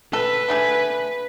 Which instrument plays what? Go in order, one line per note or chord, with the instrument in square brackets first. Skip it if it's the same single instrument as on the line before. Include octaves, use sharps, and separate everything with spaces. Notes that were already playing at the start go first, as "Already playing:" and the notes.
[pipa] A4 [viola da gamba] B4
[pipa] D3 A3 G#4